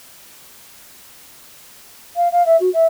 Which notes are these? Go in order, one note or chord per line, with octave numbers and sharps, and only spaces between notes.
F5
F5
E5
F#4
E5